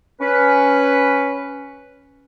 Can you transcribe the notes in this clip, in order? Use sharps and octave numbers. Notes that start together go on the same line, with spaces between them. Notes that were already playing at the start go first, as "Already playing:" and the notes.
C#4 B4